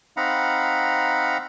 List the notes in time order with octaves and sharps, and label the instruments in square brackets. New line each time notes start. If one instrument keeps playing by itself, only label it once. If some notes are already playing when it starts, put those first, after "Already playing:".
[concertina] C4 D#4 F5 F#5 A#5 B5